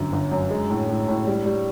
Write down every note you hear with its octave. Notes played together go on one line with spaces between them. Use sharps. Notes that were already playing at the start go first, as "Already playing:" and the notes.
Already playing: G1 F#2
G1
F#2
G#3
A2
A2
A2
G3
G3